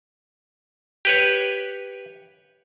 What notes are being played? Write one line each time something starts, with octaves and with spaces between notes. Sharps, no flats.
G4 B4 C#5